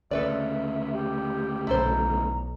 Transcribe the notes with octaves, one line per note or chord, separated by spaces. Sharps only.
D2 C#3 A4 B4 D5 E5
G4
B1 E4 A4 C5 A#5